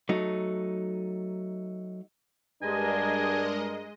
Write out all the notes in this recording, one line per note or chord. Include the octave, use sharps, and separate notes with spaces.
F#3 A3 D#4
G2 G#3 D4 A#4 D#5 G#5